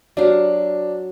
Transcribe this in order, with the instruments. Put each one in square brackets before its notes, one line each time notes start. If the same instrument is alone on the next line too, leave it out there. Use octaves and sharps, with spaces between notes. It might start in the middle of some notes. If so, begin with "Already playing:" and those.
[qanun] F#3 G4 F5 [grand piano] D4